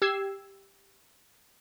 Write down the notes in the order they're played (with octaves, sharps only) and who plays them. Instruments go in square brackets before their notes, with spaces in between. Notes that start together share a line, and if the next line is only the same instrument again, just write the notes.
[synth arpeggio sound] G4 E6 G#6 C7